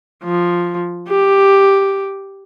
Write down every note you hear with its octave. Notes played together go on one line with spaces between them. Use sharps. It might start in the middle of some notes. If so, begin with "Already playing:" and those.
F3
G4